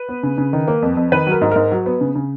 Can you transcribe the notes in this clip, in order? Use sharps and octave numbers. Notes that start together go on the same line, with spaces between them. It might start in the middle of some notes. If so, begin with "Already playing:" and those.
Already playing: B4
B3
C#3
C#3
D#3
A#3
F2
F2
D#3 B4
F#3 A#4
G#2
G#2 A#4
F#3
B3
C#3
C#3